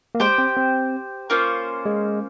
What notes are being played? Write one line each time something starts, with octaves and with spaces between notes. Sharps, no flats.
A#3
G#3 G4 C5 G5
C4
C4
A#3 C#4 F4 C5
G#3